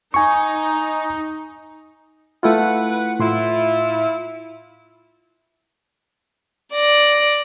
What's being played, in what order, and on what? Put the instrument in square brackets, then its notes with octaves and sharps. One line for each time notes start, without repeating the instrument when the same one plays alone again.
[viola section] D#4 [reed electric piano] G#5 C#6
[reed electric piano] A3 E4 F4 [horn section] B4 F#5
[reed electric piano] A2 C6 [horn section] E4 F4
[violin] D5 A#6